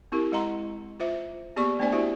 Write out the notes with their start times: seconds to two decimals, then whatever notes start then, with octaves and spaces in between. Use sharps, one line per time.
0.12 C4 E4 G4 A#4
0.32 G#3 D#5 F#5 A#5 C6
1.00 F4 C5 E5
1.56 A#3 B3 G4 G#4 D5 C#6
1.79 A3 B3 D4 C5 D5 G#5
1.92 E4 F#4 G4 C5 E5